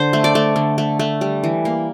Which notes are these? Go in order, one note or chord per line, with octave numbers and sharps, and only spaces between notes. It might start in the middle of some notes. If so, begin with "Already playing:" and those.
Already playing: D3 C5
A3
D5
A3
D3
A3
A3
G3
E3
A#3